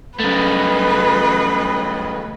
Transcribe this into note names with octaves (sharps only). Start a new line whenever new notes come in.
F#2 C#3 A3 B4 D#5